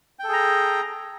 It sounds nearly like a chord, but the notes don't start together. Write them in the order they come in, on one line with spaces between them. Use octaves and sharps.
G5 A4 G#4 A#5